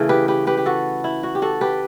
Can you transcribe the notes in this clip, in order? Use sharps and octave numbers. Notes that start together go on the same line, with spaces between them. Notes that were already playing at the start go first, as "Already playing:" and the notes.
Already playing: C#3 E3 A3
G4 B4
G4 B4
G4 B4
G4
F#4 A4
E4
F#4
G4
F#4 A4
G4 B4